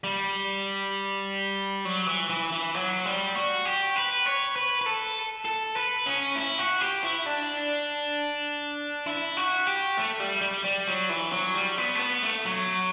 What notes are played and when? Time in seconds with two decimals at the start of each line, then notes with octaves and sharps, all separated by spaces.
0.04 G3
1.85 F#3
2.07 E3
2.30 E3
2.52 E3
2.75 F#3
3.06 G3
3.36 F#4
3.65 G4
3.96 B4
4.26 C#5
4.56 B4
4.81 B4
4.86 A4
5.45 A4
5.76 B4
6.06 C#4
6.36 E4
6.59 F#4
6.81 G4
7.04 E4
7.26 D4
9.07 E4
9.37 F#4
9.67 G4
9.97 A3
10.20 G3
10.41 G3
10.65 G3
10.88 F#3
11.10 E3
11.32 F#3
11.54 G3
11.78 B3
11.95 A3
12.00 B3
12.23 A3
12.45 F#3